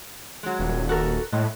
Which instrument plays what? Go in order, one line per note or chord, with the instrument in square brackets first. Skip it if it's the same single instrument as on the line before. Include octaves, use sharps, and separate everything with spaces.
[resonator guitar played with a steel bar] F#3 G#3
[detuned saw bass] D#1
[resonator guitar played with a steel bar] F#4 A4 A#4
[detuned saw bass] A2 [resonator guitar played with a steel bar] G#3